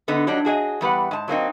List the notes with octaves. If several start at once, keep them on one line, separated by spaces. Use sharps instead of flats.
D3 B3 D#4
F#3 G3 D4 D#4
F#4 G#4 D5 D#5
E2 G3 B4 F#5
G#2 A5
F#3 A#3 C4 D#4